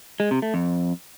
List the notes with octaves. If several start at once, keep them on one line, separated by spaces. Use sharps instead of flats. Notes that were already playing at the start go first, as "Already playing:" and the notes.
G#3
C3
A3
F2